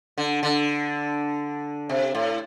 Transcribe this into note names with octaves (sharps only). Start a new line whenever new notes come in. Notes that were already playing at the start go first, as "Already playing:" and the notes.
D3
D3
C3
A2